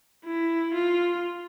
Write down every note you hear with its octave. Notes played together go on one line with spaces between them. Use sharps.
E4
F4